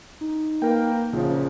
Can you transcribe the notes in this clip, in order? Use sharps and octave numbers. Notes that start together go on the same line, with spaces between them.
D#4
A#3 A#4 B4 G5
A#1 C#3 F3 F4